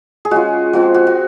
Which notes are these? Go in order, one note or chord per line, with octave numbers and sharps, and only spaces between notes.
G#4
G#3 C#4 F4 F#4
F3 G#3 C4 F4 F#4
F#4
F#4